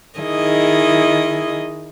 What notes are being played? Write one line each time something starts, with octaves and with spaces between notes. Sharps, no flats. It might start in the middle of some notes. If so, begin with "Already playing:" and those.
D#3 E4 G#4 D#5